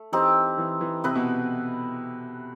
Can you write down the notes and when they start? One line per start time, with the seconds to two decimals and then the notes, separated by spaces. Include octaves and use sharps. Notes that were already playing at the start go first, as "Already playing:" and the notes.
Already playing: A3
0.12 E3 C4 D#4 G4
0.58 E3
0.81 E3
1.04 C3 E4 B4 D#5
1.15 B2